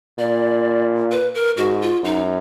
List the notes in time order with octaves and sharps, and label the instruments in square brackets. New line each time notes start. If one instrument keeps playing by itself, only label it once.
[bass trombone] A#2 [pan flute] D5
[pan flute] B4
A#4
[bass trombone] G#2 [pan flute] F#4
[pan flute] F4
[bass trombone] F#2 [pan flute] D#4